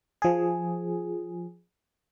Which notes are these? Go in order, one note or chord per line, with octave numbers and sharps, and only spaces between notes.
F3 G#4